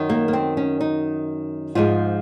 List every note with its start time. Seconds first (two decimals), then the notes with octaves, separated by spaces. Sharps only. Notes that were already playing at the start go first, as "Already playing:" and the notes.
Already playing: F#2 D#3
0.10 A#3
0.28 A#3
0.33 C4
0.57 C#4
0.81 D#4
1.75 G#2 F3 G#3 F4